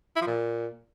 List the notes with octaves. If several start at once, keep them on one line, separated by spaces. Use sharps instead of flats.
E4
F3
A#2